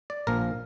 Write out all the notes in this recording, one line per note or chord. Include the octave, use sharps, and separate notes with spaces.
D5
A#1 A#2 F3 A#4